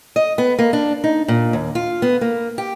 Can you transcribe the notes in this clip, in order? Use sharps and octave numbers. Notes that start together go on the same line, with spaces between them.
D#5
B3
A#3
D4
D#4
A#2
D#2
F4
B3
A#3
G4